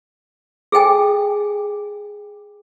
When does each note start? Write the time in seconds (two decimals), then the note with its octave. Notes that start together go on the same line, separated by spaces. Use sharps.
0.72 G#4 A4 G5 G#5